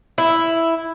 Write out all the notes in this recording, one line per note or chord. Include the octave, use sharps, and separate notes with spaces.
E4